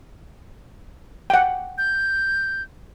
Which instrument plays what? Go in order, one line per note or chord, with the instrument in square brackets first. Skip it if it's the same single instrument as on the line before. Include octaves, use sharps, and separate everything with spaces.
[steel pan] F#5 G5
[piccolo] G6